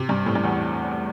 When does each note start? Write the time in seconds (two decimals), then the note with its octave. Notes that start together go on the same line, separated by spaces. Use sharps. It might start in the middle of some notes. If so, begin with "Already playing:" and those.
Already playing: C3
0.09 G2
0.26 A2
0.35 G2
0.44 E2